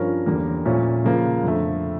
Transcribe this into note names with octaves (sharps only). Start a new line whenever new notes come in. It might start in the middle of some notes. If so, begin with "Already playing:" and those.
Already playing: G2 F3 C#4 F4 A#4
E2 D3 G3 A#3
A#2 F3 A3 C#4
C#3 F3 A#3
F2 D3 A3